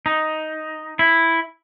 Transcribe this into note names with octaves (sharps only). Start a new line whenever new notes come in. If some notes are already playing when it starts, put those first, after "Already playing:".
D#4
E4